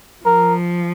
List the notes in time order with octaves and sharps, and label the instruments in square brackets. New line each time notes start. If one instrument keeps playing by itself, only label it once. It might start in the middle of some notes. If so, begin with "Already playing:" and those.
[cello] F3 [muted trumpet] A#4